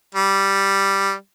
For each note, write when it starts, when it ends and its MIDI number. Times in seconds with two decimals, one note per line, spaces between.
0.15 1.13 55